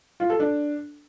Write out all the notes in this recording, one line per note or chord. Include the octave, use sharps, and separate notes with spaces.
F4
A4
D4